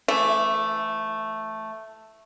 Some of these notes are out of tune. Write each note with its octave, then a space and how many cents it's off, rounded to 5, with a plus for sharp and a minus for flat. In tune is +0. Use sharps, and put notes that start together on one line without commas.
E3 +30 A3 +0 E4 +0